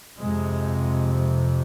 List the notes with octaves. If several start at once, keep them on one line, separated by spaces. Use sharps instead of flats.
F2 C3 G#3